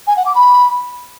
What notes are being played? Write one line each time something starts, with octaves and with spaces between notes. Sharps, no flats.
G#5
F#5
D6
B5